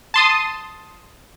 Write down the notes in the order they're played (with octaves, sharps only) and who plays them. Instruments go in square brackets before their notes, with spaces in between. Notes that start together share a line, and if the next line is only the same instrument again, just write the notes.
[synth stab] A5 C6 D#6